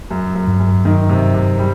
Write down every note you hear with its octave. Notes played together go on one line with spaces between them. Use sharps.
F#2
F#2
G2
F#2
D#3
C3
C3
G3